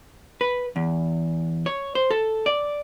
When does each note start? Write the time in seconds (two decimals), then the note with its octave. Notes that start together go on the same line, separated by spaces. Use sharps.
0.41 B4
0.76 E2
1.66 C#5
1.95 C5
2.11 A4
2.46 D5